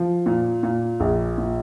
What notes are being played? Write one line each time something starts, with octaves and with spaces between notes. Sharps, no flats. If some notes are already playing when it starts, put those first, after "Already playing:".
Already playing: F3
A#2
A#2
A#1
A#2